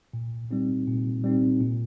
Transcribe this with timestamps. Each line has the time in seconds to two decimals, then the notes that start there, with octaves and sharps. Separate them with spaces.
0.13 A#2
0.51 G3 C4 D#4
0.87 A#2
1.24 G3 C4 D#4
1.61 A#2